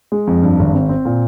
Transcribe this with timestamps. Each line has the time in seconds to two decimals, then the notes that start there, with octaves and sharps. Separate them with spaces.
0.12 G#3
0.27 F2
0.43 G2
0.59 G#1
0.74 C4
0.89 C4
1.05 A#2